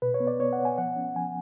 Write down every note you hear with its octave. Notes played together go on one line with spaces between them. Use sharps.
B2 B4
C#5
B3
D5
B3 C#5
F#5
B3
G#5
F3 F#5
C#4
F3 G#5